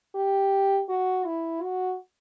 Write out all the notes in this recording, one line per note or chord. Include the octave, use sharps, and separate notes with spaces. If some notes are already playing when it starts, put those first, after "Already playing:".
G4
F#4
E4
F#4